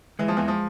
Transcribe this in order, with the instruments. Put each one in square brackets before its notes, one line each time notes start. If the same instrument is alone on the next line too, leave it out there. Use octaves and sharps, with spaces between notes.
[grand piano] E3 [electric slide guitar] G#3
[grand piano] F3
E2 E3
F3